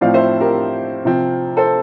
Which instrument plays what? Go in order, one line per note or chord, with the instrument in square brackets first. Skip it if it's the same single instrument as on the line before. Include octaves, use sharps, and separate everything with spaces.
[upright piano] A2 F3 C4 D5 F5
C5 E5
G4 A#4
C3 F3 C4
A4 C5